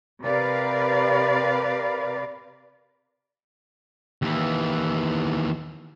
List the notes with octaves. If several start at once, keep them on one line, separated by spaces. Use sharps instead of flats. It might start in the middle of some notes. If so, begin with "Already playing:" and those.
C3 A#4 B4 D5 F5
D#2 E3